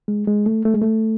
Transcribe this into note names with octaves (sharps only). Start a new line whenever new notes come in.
G#3
G#3
A3
A3
G#3
A3